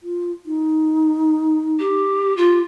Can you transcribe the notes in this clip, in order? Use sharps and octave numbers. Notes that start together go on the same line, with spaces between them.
F4
D#4
G4
F4